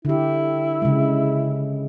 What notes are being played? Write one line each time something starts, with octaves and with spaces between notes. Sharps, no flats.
D3 E4 G4
C#3 G#3